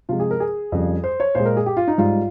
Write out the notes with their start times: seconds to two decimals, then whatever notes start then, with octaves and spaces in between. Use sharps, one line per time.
0.09 C3 F3 G#3 F4
0.20 G#4
0.31 A#4
0.40 G#4
0.72 F2 C#3 G3
1.04 C5
1.20 C#5
1.35 A#2 G#3 C5
1.45 A#4
1.57 G#4
1.66 G4
1.77 F4
1.88 D#4
1.98 G#2 G3 F4